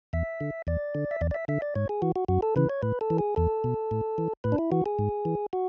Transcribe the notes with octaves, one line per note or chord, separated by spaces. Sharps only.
E2 E5
D3
E2 D5
D3
E5
E2 D5
D5
E5
D3 E5
D5
G#2 C#5
G#4
E3 F#4
F#4
F#2 F#4
A4
C#3 E3 B4
C#5
A2 B4
A4
E3
G#4
E2 A4
B2
A2
E3
A2 B4
D4
E4
E3 F#4
G#4
G#2
E3
F#4